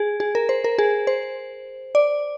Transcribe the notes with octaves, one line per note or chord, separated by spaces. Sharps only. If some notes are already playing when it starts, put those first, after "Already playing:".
Already playing: G#4
G#4
A#4
C5
A#4
G#4
C5
D5